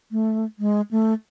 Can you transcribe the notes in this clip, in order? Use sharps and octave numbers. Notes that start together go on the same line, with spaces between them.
A3
G#3
A3